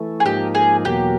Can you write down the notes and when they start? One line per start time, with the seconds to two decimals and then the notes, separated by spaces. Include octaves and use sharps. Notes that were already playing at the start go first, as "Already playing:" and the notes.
Already playing: E3 A3
0.20 G#4
0.25 G#2 F3 A#3 D#4 G4
0.55 G#4
0.85 E2 B2 F#3 A#3 G4